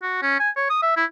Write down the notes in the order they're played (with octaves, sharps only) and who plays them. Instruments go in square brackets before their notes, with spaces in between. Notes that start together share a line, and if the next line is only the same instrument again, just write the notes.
[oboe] F#4
C#4
G#5
C#5
D#6
E5
E4